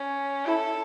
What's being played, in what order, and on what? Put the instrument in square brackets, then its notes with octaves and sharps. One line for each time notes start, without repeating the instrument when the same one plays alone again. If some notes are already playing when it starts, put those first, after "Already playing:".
Already playing: [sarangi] C#4
[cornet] E4 [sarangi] A4